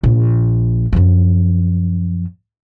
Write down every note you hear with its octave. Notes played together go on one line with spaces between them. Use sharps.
A#1
F#2 F3